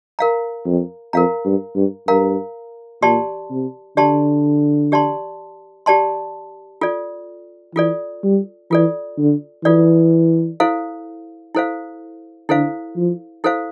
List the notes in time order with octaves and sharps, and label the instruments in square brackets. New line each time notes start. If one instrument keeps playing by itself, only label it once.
[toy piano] A#4 F5 A#5
[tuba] F2
[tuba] F2 [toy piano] A#4 F5 A#5
[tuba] G2
G2
[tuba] G2 [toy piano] A#4 F5 A#5
[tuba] A#2 [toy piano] G4 D5 A5 C6
[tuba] C3
[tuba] D3 [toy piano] G4 D5 A5 C6
[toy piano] G4 D5 A5 C6
G4 D5 A5 C6
F4 A4 D5
[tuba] E3 [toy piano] F4 A4 D5
[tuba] G3
[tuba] E3 [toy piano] F4 A4 D5
[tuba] D3
[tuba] E3 [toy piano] F4 A4 D5
[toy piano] E4 A4 C5 F5
E4 A4 C5 F5
[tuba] D3 [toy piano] E4 A4 C5 F5
[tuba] F3
[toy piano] E4 A4 C5 F5